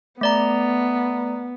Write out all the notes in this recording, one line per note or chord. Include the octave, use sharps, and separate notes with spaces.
A3 B3 D5 A#5